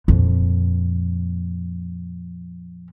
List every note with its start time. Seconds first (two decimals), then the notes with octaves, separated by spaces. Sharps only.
0.08 F2 A#2